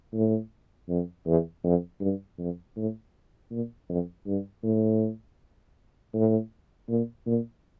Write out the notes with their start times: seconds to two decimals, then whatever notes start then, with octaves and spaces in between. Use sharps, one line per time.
0.13 A2
0.89 F2
1.27 E2
1.64 F2
2.01 G2
2.38 F2
2.77 A2
3.51 A#2
3.89 F2
4.26 G2
4.63 A2
6.14 A2
6.89 A#2
7.26 A#2